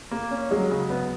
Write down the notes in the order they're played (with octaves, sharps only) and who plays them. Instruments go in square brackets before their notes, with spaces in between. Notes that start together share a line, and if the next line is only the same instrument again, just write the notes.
[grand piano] A#3
C#4
[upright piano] F#3 [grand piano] G#3
[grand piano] C#3
B3